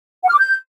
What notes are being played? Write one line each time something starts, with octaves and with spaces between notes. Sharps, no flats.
F#5
F6
D6
G6